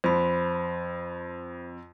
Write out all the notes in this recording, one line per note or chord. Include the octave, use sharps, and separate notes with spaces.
F2 C5 B5